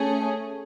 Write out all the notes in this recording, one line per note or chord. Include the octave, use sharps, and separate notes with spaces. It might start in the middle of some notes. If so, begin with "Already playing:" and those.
Already playing: A3 C#4 G#4